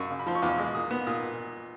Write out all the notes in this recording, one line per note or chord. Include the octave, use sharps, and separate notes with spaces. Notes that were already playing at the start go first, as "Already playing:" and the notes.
Already playing: F#2 C#6
C#3
B5
F3 C6
C#6
E2 D6
G#3
A#2 D#6
B3
A#2 D#6